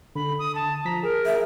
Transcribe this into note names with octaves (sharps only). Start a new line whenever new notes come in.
D3 B5
D#6
A5
F3 A#5 B6
G#4 A#4
E5